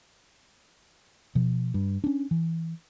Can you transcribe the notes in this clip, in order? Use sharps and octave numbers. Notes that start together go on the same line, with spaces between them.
B2 F3
G2
C#4 D4
E3